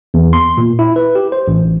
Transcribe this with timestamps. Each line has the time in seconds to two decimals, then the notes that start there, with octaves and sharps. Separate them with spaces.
0.14 E2
0.33 C6
0.57 A#2
0.79 E4
0.96 B4
1.15 G4
1.32 C5
1.48 A1